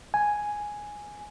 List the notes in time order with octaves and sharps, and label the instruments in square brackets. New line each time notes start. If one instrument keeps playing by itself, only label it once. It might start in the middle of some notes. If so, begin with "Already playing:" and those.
[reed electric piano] G#5